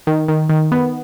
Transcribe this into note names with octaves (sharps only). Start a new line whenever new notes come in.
D#3
D#3
D#3
B3